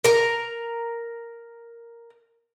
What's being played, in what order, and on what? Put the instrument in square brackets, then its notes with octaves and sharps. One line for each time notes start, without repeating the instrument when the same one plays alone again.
[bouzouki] A#4 A#5